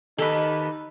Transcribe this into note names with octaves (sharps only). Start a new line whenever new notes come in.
D#3 D#4 G4 A4 B4 D#5